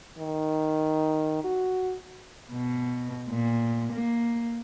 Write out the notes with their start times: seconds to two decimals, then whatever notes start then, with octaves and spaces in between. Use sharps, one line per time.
0.18 D#3
1.44 F#4
2.52 B2
3.29 A#2
3.93 A#3